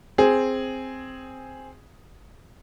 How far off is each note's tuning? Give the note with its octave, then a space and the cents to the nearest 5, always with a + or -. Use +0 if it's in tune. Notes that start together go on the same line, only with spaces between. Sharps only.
C4 +0 G#4 +0